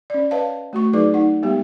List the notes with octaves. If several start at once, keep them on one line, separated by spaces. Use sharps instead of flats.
C#4 D5
B4 C#5 D#5 F5 A5
A3 F#4 C#6
F#3 D#4 G#4 B4 D5 D6
D#4 F#5
G3 G#3 A#3 B3 G4